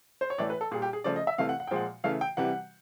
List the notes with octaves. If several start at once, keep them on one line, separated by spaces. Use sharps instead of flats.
C5
C#5
A2 E3 A3 D5
B4
A4
A#2 G3 G#4
G4
G#4
C#3 F3 A3 D5
D#5
E5
C3 E3 A3 F5
F#5
F#5
G5
A#2 F3 G#3 F#5
C#3 E3 A3 F5
G5
C3 E3 G3 F#5